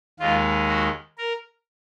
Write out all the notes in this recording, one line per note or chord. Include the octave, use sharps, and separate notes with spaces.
D#2 D#3 G#3 F4
F#4
A#4